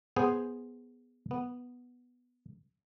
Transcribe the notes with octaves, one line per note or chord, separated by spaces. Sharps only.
B3 G#4 C5
B3